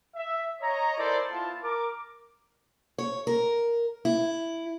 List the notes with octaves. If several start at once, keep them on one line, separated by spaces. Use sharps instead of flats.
E5
C#5 D#5 A#5
D#4 E4 A4 A#4 C5 D5
B3 E4 F4 A5
A#4 D6
C#5
A#4
E4